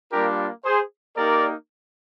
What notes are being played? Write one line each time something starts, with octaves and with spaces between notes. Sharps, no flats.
G3 A#3 D4 F4 G4 A#4
G#4 C5
A#3 D#4 G4 A#4 D5